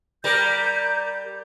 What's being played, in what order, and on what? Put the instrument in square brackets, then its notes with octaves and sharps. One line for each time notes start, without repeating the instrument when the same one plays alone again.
[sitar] G3 A#4 [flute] G6